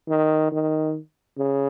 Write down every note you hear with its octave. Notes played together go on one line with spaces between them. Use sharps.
D#3
D#3
C#3